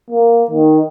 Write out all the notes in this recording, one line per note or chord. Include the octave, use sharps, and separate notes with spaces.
A#3
D#3